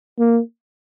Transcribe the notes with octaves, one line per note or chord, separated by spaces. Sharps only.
A#3